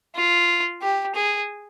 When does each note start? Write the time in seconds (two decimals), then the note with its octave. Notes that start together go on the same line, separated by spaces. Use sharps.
0.16 F4
0.82 G4
1.15 G#4